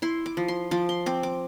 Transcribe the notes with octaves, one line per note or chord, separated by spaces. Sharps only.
E4 C6
D6
F3
C6
F3 D6
C6
C4 D6
D6